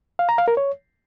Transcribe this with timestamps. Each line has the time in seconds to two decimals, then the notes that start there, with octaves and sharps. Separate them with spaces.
0.19 F5
0.29 A#5
0.38 F5
0.48 A#4
0.57 C#5